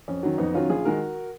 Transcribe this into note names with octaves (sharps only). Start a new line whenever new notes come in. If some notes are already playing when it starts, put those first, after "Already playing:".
F2 C#4
D#3 F#3
F2 B3 D#4
D#3 F#3 C#4 F4
A#1 F4 G#4
D#3 G#3 F#4 A#4